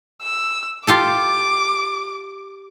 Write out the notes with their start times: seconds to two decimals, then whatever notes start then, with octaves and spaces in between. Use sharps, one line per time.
0.22 E6
0.87 F4 G4 A4 D6